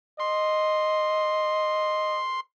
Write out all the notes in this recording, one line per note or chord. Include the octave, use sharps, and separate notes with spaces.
D#5 C6